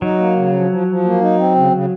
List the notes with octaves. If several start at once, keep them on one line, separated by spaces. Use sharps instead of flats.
F#3 D#4
A#3
C#3
F3
F3
F3
A#3
D#4
C4
C#3
C#3